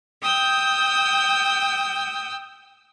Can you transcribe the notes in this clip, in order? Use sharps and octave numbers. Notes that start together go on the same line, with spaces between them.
G5 D#6 E6 G6